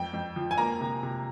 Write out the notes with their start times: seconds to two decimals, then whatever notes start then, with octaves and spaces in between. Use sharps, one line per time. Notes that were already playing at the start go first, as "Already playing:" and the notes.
Already playing: F2 G5
0.13 F2
0.36 F3
0.51 G#5
0.58 A#3 A#5
0.81 C3
1.03 C3